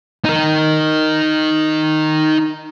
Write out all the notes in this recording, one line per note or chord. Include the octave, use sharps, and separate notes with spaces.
D#4 A#4